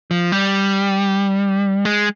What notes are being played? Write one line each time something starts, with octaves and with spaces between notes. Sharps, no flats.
F3
G3
G#3